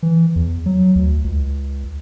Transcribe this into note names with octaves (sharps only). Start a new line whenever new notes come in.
E3
E2
F#3
D2
C#2